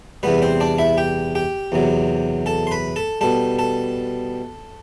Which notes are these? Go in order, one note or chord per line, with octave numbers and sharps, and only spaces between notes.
E2 C3 G3 B3 B4
C4 C5
D4 D5
E4 E5
G4 G5
G4 G5
E2 C3 F#3
A4 A5
C6
B4 B5
A4 A5
B2 G3 A4 A5
A4 A5